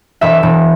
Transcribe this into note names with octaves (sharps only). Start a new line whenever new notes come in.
E1 E5
E1